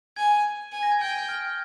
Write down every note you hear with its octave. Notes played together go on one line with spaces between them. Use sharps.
G#5 G#6
G#5
A#6
G#6
G5 G6
G6
F6